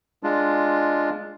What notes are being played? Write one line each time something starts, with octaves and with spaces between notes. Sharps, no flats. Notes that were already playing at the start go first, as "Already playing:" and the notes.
G#3 D4 F4